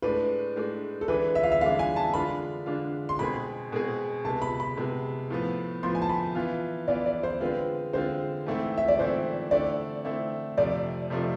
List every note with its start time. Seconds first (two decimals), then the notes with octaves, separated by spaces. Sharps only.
0.02 A2 G#3 D4 B4
0.56 A2 G#3 D4
1.01 A4
1.08 E3 G#3 D4 B4
1.35 E5
1.43 F5
1.52 E5
1.61 E3 G#3 D4 F5
1.79 G#5
1.96 A5
2.14 D3 G#3 D4 F4 B5
2.66 D3 G#3 D4 F4
3.09 C6
3.19 B2 G#3 C4 G#4 B5
3.72 B2 G#3 C4 G#4
4.24 C3 G#3 B3 A5
4.42 B5
4.60 B5
4.77 C3 G#3 B3
5.30 A2 F3 B3
5.83 A2 F3 B3 C6
5.95 G#5
6.02 A5
6.09 B5
6.35 E3 B3 F4
6.88 E3 B3 F4 D5
7.06 D5
7.23 C5
7.41 D3 G#3 C4 F4 B4
7.93 D3 G#3 C4 F4 C5
8.47 G#2 E3 A3 C4 E4
8.78 E5
8.88 D5
8.99 G#2 E3 A3 C4 E4 C5
9.51 D3 A3 C4 E4 D5
10.05 D3 A3 C4 E4
10.57 F2 C3 F3 A3 D5
11.10 F2 C3 F3 A3